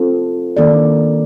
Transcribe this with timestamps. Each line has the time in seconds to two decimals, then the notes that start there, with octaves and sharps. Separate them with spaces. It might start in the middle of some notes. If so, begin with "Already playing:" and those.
Already playing: C4 F4 A4
0.57 D#3 A#3 D4 A4 D5